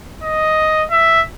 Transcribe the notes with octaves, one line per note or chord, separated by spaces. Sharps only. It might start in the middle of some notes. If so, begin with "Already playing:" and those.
D#5
E5